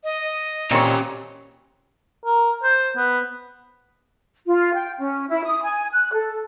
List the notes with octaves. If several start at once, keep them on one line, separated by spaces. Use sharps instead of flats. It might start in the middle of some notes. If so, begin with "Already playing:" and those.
D#5
A#2 C4 C#4 G4 C#5
A#4
C5
B3
F4
G5
C#4
E4
D#6
G#5
F#6
A4